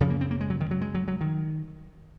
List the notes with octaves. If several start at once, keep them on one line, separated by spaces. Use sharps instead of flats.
F#2 C#3 F3
A#3
C4
A#3
G#3
F#3
D#3
F#3
G#3
F#3
F#3
D#3